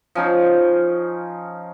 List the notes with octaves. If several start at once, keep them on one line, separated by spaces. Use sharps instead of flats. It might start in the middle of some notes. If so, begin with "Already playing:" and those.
F3 C#4 D#4